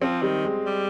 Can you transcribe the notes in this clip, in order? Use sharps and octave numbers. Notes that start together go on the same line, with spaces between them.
F3 C4
D#3 G3
G#3
G3